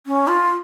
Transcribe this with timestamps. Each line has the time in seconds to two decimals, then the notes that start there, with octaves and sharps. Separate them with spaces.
0.07 C#4
0.28 F4